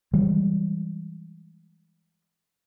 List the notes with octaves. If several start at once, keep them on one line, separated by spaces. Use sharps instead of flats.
E3 G3 G#3